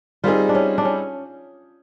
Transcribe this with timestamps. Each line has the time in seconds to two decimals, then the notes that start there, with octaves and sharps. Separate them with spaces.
0.24 G3 C4 D#4 F4 G#4
0.49 D4
0.55 C#4
0.78 D4
0.85 C#4